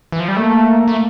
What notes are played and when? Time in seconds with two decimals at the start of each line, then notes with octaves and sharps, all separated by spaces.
0.12 E3
0.20 F3
0.28 G3
0.36 A3 A#3
0.88 A3